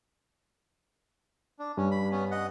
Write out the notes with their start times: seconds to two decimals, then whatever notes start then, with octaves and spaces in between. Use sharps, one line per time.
1.59 D4
1.77 G2 C#4
1.91 B5
2.11 B3 C#4
2.31 D#5 F#5